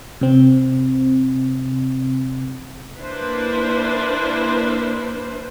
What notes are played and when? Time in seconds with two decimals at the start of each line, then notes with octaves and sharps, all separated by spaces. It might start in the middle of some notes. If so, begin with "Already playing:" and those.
0.21 C3 C4
2.99 A#3 D4 E4 B4 C5